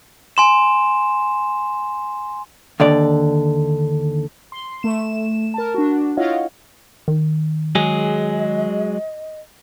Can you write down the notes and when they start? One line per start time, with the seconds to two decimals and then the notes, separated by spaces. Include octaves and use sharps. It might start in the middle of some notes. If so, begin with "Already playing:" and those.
0.37 G#5 C6 E7
2.80 D#2 D3 D5
4.52 C6
4.83 A3 E7
5.54 A#4 A5
5.74 D4 F#4
6.17 E4 F4 C#5 D#5 F5 F#5
7.08 D#3
7.75 F#3 G#3 G#4 D#5